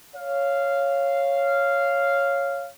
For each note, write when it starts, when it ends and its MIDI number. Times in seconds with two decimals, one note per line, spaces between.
0.16 2.68 73
0.16 2.68 77